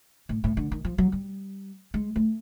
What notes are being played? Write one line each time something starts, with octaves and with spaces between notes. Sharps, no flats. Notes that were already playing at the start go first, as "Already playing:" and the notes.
A2
A2
D3
D#3
F3
F#3
G3
G#3
A3